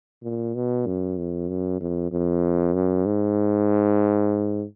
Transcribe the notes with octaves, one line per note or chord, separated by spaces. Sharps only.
A#2
B2
F#2
F2
F#2
F2
F2
F#2
G#2